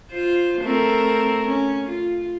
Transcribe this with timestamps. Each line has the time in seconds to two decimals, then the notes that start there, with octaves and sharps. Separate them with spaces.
0.12 F4 C5
0.62 A3 C4 A#4
1.48 C#4
1.89 F4